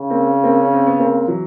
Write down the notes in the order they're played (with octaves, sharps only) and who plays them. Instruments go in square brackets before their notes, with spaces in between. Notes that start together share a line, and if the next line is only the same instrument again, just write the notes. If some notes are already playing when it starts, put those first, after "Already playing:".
Already playing: [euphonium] C#3
[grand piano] A#3 C4
A#3 C4
C#4
C4
B3
A#3 C4
E3 F#3